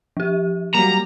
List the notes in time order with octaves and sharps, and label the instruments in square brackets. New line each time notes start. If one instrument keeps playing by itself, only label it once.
[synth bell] F3 G4
[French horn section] F#3 A#3 [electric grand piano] G3 [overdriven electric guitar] A#5